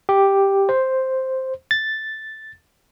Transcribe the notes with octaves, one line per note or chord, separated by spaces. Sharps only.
G4
C5
A6